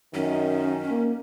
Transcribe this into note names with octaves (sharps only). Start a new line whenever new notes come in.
F#2 D#3 C#4
A#3